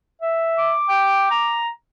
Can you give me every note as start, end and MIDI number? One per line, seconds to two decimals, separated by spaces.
0.21 0.72 76
0.58 1.58 86
0.89 1.30 79
1.30 1.70 82